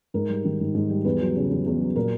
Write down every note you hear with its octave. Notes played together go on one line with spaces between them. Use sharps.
G#2 A#4
G3
D#3
G#2
G#2
G3
E2 B4
F#3
C#3
E2
E2
F#3
A#2 A#4